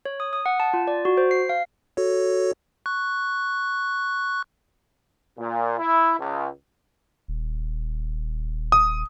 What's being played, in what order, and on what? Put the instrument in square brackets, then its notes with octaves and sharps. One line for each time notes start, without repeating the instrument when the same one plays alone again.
[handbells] C#5
D#6
D#6
F#5
A5
F4
D5
F#4
C5
C7
F5
[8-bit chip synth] F#4 A4 C#5
C#6 F#6
[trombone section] A#2
E4
C#2
[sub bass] D#1
[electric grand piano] D#6